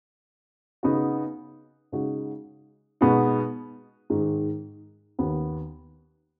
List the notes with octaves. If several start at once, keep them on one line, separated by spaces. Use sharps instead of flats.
C#3 B3 D#4 F#4
C#3 G#3 D#4 F#4
B2 G#3 B3 D#4 F#4
G#2 D#3 G#3
D#2 D#3 B3